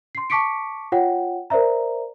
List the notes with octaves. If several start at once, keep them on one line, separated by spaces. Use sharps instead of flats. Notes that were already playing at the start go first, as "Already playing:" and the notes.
C6 C7
A5 C#6 D6 B6 C#7 D7
F4 C#5 F#5 G5
A#4 C5 D5 E5 A#5